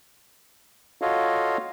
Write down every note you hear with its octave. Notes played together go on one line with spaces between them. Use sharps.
F4 F#4 A4 C#5 D#5 F5